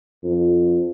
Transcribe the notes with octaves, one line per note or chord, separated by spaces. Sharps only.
F2